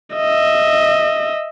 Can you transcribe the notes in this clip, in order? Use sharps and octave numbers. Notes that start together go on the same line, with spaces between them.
D#5 E5